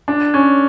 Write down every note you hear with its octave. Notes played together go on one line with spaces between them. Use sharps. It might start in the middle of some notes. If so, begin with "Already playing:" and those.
D4
C#4